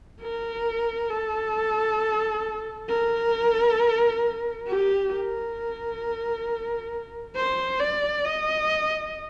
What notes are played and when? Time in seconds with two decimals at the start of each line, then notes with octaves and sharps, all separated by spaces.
0.21 A#4
1.10 A4
2.89 A#4
4.68 G4
5.12 A#4
7.36 C5
7.80 D5
8.25 D#5